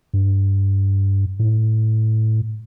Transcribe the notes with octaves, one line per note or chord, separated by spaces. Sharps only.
G2
A2